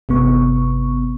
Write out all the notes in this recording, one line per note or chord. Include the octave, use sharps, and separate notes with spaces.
G1 C3 B3 C#6